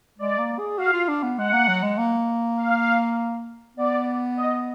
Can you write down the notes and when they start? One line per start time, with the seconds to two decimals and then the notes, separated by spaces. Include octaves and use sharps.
0.18 G#3 D5
0.38 A#3
0.59 G#4
0.78 F#4 F5
0.93 F4
1.08 D4
1.23 B3
1.38 G#3 F#5
1.53 A#3
1.68 F#3
1.83 G#3
1.98 A#3
2.57 F5
3.77 B3 D5
4.37 D#5